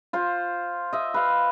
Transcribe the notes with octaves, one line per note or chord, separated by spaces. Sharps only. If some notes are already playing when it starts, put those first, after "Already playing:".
F4 C5
D#5 E5
B4 F5